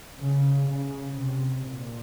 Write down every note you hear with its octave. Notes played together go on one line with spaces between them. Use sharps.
C#3
C#3
C3
A#2